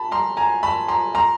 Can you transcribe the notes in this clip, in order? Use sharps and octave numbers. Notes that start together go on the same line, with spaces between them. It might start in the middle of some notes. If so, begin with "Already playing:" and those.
Already playing: A5 B5
A#5 C6
G#5 A#5
A5 B5
A#5 C6
A#5 C6